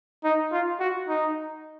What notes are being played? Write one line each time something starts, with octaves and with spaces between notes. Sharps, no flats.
D#4
F4
F#4
D#4